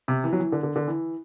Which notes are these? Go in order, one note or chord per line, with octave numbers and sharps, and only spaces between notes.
C3
E3
F#3
E3
D3
D3
D3
E3